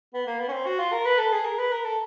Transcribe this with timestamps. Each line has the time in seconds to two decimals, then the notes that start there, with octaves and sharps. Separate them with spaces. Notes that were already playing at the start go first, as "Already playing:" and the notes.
0.14 B3
0.27 A#3
0.40 B3
0.48 C#4
0.53 C4
0.66 F#4
0.79 F4
0.92 A#4
1.05 B4
1.18 A4
1.32 G#4
1.45 A#4
1.58 B4
1.72 A#4
1.85 A4